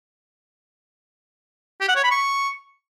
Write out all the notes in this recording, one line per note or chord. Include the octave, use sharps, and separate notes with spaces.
G4
F#5
C#5
B5
C#6